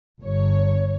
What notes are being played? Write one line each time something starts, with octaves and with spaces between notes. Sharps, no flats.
G1 C#5